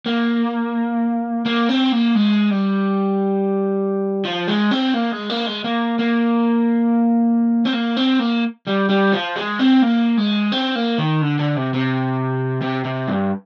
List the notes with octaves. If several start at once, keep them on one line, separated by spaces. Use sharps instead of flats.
A#3
A#3
C4
A#3
G#3
G3
F3
G#3
C4
A#3
G#3
A#3
G#3
A#3
A#3
C4
A#3
C4
A#3
G3
G3
F3
G#3
C4
A#3
G#3
C4
A#3
D#3
D3
D3
C3
C3
C3
C3
G2